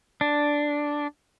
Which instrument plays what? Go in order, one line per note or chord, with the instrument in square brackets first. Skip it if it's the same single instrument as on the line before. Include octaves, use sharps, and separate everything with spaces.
[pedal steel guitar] D4